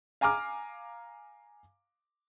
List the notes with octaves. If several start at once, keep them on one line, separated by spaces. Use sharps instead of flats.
F5 G#5 A#5 D6 F6